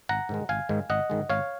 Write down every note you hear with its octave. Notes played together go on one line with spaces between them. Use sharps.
G#1 F#5 A#5
G#2 D#3 G#3
G#1 F5 G#5
G#2 D#3 G#3
G#1 D#5 F#5
G#2 D#3 G#3
G#1 C#5 F5